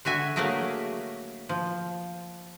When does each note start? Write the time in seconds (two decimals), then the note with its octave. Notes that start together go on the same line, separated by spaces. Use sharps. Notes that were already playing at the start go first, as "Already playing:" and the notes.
0.05 D3 F#4 E5 G#5
0.36 F#3 A3 A#3 G#4 A#4 E5
1.49 F3